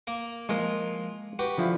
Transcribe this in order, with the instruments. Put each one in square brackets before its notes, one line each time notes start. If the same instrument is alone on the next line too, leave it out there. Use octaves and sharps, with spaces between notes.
[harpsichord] A#3 A#4
[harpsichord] F3 F4 A#4 [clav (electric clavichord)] G#3 A#3
[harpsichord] F#4 G4 B4
[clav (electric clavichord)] D3 F3 E4